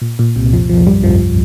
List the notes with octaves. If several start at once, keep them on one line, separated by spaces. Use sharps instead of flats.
A#2
A#2
C2 C3
F2 F3
F2 F3
G2 G3
F2 F3